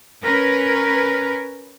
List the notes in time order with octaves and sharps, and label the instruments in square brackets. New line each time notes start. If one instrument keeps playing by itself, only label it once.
[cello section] C#4 A#4 B4